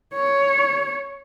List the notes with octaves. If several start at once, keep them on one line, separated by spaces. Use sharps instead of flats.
C#5